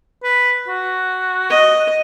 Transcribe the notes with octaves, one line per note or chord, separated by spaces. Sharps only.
B4
F#4
D#5